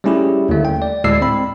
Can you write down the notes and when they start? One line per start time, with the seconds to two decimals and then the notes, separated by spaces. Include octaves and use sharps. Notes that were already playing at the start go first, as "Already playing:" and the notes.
0.04 G3 A3 C#4 E4 G4 G#4
0.49 D#2 D3 A3
0.65 G5
0.82 D5
1.04 D2 A2 G#3 D5 E6 C7
1.21 C4 B5